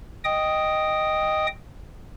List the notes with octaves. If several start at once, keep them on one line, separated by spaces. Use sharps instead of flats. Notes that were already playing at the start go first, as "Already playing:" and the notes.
D#5 G5 D#6